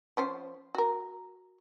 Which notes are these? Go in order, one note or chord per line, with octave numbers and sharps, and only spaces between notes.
F3 C#4 C5
F#4 A#4